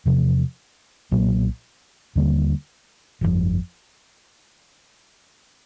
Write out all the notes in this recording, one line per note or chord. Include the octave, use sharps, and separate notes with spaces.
E2 C3 F3
B1 A#2 F#3 A#3
D#2 D3 G3 A#3
G1 F2 C#3 F3